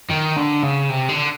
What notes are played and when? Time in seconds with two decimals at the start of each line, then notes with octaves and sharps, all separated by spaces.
0.11 D#3
0.37 D3
0.63 C#3
0.90 C3
1.09 D3